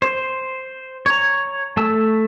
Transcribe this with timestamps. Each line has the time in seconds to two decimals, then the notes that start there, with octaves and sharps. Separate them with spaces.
0.02 C5
1.06 C#5 A#5
1.77 A3 A5 E6